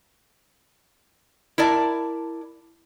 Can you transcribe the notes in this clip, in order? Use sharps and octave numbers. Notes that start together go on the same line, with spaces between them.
E4 A#4 D5 A5